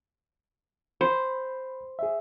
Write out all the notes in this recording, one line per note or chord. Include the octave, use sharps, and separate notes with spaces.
C5 B5
G#4 E5